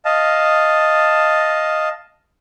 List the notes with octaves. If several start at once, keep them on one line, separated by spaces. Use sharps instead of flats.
D#5 F5 A5